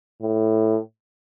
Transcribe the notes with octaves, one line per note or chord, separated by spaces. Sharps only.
A2